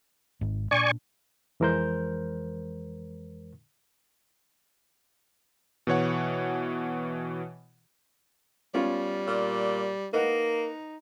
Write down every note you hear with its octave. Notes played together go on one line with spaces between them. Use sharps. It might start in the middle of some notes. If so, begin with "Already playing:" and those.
G#1 G#2
A#2 D4 D5 G#5 C#6
F2 E3 G#3 A#4 C5 G6
B2 E3 C#5 F#5
G3 B3 C#4 F4
A#2
A#3 D#4 B4 D#5 F#5